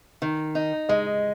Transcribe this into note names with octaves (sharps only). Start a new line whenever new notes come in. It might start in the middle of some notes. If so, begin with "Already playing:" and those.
D#3
D#4
G#3 D#5